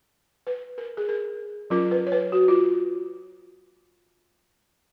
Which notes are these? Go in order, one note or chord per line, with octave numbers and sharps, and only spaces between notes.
B4
A#4
G#4
A#4
F#3 C#4 F4 A#4
B4
C#5
B4
F#4
F4